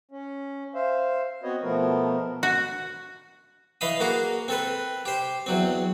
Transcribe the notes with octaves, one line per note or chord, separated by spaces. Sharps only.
C#4
C5 E5 F5
B3 C4 F#4 B4 C#5 D#5
B2 F3 A3 B3 A#4
F#4
E3 D#5 F5 B5 D#6
A#3 F#4 G#4 A#4
C4 A4 B4
G4 C5
E2 F#3 C4